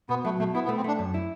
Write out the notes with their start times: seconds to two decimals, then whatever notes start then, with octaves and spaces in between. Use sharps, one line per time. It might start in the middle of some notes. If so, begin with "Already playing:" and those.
0.09 B2 B3
0.25 F#3 A3
0.39 B2 A3
0.55 B3 E4
0.65 B3
0.69 A3
0.77 C4
0.84 A3 D4
0.99 F#2
1.14 E4